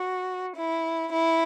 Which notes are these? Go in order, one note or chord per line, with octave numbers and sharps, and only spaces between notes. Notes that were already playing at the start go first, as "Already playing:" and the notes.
Already playing: F#4
E4
E4